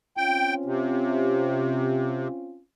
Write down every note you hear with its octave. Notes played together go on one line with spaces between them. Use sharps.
C4 C#4 F4 G5
C3